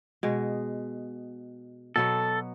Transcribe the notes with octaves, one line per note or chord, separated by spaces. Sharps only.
B2 G#3
B2 F#3 B3 A4